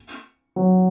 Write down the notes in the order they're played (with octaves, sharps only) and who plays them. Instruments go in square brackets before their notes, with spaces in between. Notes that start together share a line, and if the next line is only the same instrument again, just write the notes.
[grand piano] F#3